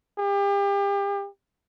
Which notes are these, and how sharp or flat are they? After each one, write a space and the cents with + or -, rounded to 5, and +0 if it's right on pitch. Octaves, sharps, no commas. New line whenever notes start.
G4 +35